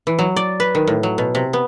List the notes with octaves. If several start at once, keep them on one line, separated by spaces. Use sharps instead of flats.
E3
F#3
D5
B4
D#3
A2
F#3
B2
C3
B3